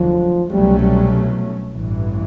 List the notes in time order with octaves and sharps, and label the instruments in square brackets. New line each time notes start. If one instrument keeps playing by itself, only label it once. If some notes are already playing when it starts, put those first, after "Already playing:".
Already playing: [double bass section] F1 D#2 D3 F#3 [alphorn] F3
[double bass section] C2 B2 F#3 A3 C#4 [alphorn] G3
[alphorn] G3
[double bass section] A1 G2 E3